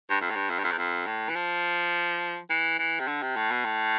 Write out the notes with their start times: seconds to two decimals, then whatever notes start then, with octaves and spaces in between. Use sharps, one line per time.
0.10 G2
0.21 F2
0.31 A2
0.36 G2
0.50 F2
0.59 G2
0.64 F2
0.72 E2
0.78 F2
1.07 A2
1.29 E3
1.36 F3
2.50 E3
2.79 E3
3.00 C3
3.08 D3
3.22 C3
3.36 A2
3.51 B2
3.65 A2